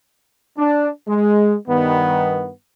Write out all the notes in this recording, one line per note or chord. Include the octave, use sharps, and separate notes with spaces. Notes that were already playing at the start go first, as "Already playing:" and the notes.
D4
G#3
G2 D#3 B3